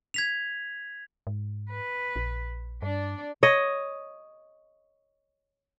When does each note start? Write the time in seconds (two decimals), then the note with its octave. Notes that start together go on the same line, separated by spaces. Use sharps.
0.14 G#6 B6 F7
1.27 G#2
1.70 B4
2.16 A#1
2.82 G2 D4 D5
3.43 C#5 D#5